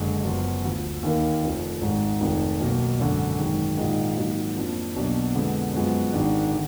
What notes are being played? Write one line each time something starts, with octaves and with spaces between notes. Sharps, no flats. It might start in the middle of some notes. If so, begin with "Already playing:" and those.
Already playing: F#1 F#2 D3 G#3
F#1 F#2 F3 B3 F4
D2 D3 F3
D#2 D#3 A#3 D#4 A#4
F1 F2 F3
G#1 G#2 D#3 G#3
F1 F2 D#3
B1 B2 A#3
G#1 F#2 D3
G#1 F#2 D#3 G#3
A#1 G#2 D#3 G#3 D#4
G#2 D#3 F#3 A#3
F2 F3 A#3 D4
B1 B2 F#3 A#3 D4
F2 D3 G#3 B3
F#2 F3 G#3 B3
G#1 G#2 D#3 G#3 D4
D3